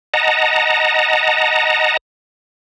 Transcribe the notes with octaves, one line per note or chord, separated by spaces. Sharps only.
D#5 F#5 A5 A#5